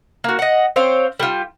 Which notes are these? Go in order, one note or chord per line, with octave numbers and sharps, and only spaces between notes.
A#3 F#4
D#5 F#5
C4 C5 C#5 F5
G3 F4